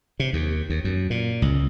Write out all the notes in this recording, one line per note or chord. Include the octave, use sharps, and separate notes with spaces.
C3
D#2
D#2
F#2
A#2
C#2